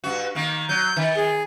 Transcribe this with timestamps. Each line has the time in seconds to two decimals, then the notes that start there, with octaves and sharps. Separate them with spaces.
0.04 G2 F#4
0.35 D#3 A#3
0.69 F#3 G6
0.96 D#3
1.17 G#4